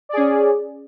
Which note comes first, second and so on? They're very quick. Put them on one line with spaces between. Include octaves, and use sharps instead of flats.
D5 G#4 C#4